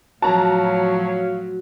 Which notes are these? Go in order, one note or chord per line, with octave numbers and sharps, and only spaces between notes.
A2 F3 F#3 F#4 C#5 F5 A5 A#5